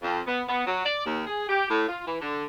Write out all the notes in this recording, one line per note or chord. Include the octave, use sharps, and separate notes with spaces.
F2
B3
B3
F#3
D5
D#2
G#4
G4
A2
F4
E3
D3